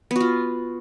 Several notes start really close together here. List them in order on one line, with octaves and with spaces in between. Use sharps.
B3 F#4 F4